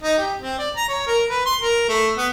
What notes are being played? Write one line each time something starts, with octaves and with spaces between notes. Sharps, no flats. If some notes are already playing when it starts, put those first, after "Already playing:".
D#4
G4
C4
D5
A#5
C#5
A#4
B4
C6
A#4
A3
B3